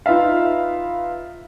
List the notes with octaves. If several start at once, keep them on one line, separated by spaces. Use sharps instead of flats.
D#4 F4 B4 E5 F5